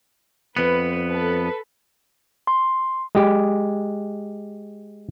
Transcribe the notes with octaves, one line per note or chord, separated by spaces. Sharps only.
F2 B3 B4
A4 B4
C6
G#3 G4